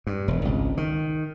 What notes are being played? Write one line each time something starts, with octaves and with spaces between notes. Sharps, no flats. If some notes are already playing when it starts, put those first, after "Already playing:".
G2
E1
G#1 C#2
D#3